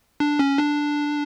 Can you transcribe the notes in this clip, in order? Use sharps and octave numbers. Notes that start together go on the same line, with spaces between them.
D4
C#4
D4